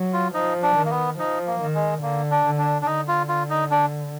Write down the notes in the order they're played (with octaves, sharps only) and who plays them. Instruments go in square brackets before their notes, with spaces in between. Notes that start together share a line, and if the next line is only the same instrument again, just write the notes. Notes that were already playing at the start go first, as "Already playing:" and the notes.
Already playing: [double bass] F#3
[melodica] F4
[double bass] F3 [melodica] D#4
[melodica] D4
[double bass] D#3
[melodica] A#3
B3
[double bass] F3 [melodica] D#4
[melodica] A#3
[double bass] D#3
[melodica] G#3
[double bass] D3 [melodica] A#3
[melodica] D4
[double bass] D3
[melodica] D4
D4
[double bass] D3 [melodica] D#4
[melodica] F4
F4
D#4
D4